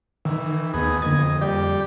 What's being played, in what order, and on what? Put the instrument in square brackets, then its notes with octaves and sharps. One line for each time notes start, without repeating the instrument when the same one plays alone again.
[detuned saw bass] D#3 [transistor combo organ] E3
[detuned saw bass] D#2 [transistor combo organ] B3 D#4 G#4
[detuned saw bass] F2 [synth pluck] D3 A#3 G#6 [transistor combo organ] D#5
[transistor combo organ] G3 G4 [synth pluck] D5